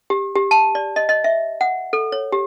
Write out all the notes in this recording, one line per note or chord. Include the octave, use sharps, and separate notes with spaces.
G4
G4
A5
D5
D#5
D#5
E5
F#5
A4
C#5
G4